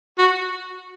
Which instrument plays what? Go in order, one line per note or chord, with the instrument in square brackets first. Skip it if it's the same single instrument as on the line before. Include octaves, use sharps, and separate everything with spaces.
[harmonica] F#4